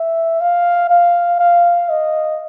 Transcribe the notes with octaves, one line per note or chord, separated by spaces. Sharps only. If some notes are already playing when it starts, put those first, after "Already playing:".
Already playing: E5
F5
F5
F5
D#5